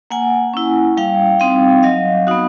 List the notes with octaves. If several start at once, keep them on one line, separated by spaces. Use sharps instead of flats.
A#3 F#5 G#5
C#4 E4
G3 F5 G5
C4 D#4 F5 G5
F#3 D#5 F5
B3 D#4 F#4